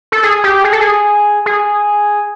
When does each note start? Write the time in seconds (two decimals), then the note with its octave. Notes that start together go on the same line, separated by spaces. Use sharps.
0.12 A4
0.23 G#4
0.44 G4
0.64 G#4
0.73 A4
0.80 G#4
1.46 G#4